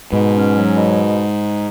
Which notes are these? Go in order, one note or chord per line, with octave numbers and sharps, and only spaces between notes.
G#2 B2
C#4
F#3
B2